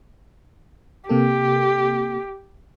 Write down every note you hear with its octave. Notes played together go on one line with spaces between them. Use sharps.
C3 A#3 G4 A4